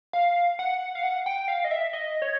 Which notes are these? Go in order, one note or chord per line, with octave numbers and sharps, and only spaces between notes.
F5
F#5
F5
F#5
G5
F5
D#5
E5
D#5
C#5